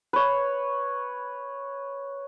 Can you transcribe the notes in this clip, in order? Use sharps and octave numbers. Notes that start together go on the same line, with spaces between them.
B4 C#5